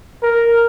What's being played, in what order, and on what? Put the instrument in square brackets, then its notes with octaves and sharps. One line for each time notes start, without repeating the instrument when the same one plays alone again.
[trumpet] A#4